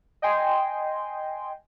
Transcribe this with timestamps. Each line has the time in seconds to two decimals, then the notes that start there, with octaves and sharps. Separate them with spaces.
0.22 D#5 G5 G#5 C6